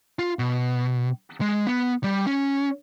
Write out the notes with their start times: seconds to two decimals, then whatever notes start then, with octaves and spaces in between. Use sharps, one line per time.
0.19 F4
0.39 B2
1.41 G#3
1.67 B3
2.04 G3
2.26 C#4